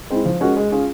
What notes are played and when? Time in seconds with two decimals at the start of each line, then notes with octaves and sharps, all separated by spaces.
0.10 G#3 C4 E4
0.25 F3
0.41 G#3 C#4 F#4 A#4
0.57 G#3
0.72 C#4 F4 G#4